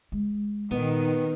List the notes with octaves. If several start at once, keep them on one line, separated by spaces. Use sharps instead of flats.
G#3
A#2 D#3 B3